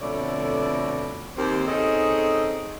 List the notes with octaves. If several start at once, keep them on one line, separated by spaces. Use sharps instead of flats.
F2 B2 D3 A3 C#5 D5
D#2 C4 G4
C4 C#4 D#4 G#4 A4